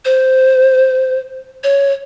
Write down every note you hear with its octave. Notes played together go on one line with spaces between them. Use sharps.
C5
C#5